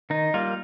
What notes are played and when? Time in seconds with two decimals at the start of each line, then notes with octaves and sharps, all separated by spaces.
0.10 D#3 D#4
0.34 G3 A#3 F4